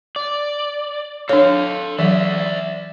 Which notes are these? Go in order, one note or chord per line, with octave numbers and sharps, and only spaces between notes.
D5
D4 A4 C#5 F5
E3 F#3 D5 E5